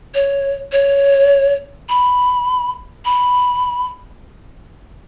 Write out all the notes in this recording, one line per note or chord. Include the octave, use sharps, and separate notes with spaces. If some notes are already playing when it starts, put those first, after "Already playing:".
C#5
C#5
B5
B5